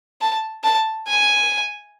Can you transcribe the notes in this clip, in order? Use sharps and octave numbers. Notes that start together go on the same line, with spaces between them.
A5
A5
G#5